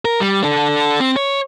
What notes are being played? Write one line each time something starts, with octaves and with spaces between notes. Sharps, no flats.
A#4
G3
D4 A4
C4
C#5